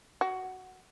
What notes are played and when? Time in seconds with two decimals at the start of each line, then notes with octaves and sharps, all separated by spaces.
0.21 F#4